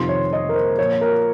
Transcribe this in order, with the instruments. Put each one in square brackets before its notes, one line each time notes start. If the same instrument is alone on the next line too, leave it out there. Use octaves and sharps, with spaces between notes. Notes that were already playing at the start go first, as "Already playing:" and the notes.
Already playing: [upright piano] F2 C3 D#3 C6
C#5
D#5
A#4
C5
A#2 F3 C#5
A#4